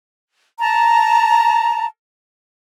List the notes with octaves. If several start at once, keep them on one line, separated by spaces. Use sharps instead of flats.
A5 A#5